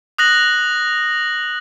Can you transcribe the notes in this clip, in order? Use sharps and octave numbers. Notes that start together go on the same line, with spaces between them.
D#6 F#6 A#6 F#7